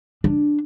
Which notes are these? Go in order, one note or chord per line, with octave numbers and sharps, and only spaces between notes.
D4